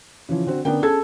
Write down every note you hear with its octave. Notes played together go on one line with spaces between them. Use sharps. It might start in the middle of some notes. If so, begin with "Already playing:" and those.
C#3 E3 F3
D3 C4 F#4
D3 B3 C#4 D4 A#4 G5
C#4 G#4 A4 A5 G#6